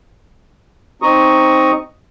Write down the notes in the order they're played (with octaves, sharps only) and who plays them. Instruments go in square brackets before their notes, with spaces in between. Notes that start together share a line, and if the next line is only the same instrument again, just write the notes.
[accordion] C4 D#4 A#5 C#6 D#6